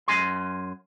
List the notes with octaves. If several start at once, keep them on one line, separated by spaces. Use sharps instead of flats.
F#2 G#5 C6